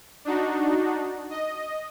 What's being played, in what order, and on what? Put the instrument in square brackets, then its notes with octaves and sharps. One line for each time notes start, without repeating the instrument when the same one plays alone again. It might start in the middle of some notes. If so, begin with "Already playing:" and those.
[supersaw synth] D4 D#4 F#4
D#5